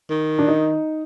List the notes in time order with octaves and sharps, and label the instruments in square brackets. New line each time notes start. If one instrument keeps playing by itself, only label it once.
[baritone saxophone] D#3
[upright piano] D4
D#4